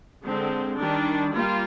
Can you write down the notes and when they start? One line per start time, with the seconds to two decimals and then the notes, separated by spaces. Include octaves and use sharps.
0.24 D3 G#3 C4
0.79 D#3 G3 D4
1.35 G3 A#3 F4